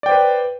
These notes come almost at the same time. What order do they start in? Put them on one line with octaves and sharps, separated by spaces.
D5 G5 C5 B4